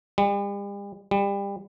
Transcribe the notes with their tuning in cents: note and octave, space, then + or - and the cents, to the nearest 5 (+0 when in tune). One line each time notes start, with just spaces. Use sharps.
G3 +45
G3 +30